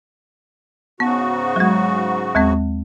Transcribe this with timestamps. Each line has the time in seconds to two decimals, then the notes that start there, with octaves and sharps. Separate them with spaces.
1.00 G#2 C#3 B3 F#4
1.56 F#3 G#3
2.35 D#2 G#3 C4